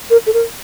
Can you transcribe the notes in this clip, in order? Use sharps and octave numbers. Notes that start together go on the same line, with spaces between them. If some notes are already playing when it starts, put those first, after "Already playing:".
A#4
A4
A#4